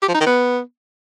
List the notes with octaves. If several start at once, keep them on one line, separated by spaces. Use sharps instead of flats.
G4
F3
D#4
D#3
B3